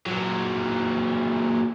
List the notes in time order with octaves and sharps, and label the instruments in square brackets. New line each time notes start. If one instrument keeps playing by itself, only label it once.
[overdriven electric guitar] A#2 F#3